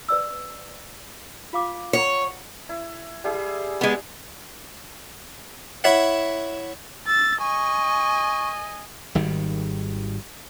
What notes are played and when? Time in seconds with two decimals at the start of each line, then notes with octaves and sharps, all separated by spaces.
0.09 B4 D5 E6
1.53 F4 F5 D6
1.93 C#5 F#5 A#5
2.69 E4
3.24 G3 E4 G#4
3.81 G#3 B3
5.84 E4 C#5 E5 F#5
7.07 E6 A6
7.39 D#5 G#5 C#6
9.15 G#1 D#3 G3